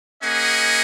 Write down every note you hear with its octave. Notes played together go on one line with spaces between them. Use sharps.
A#3 C#4 G#4 D#5 F#5